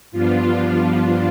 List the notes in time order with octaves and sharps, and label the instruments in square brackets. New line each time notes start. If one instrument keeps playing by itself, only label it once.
[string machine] G2 F3 B3 D4 F4